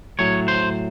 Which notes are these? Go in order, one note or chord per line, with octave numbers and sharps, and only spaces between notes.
A2 F#3 C#5
C5